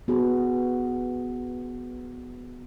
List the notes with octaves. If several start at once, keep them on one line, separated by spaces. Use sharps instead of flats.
B3 F#4 G#4